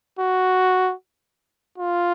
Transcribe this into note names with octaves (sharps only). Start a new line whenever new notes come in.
F#4
F4